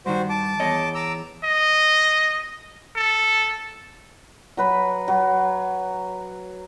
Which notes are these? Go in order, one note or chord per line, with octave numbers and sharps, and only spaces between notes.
G2 D#3 F#4 C5
A5 D6
E2 C#5 D#5
A#5 D6 E6
D#5
A4
F#3 B4 B5
F#3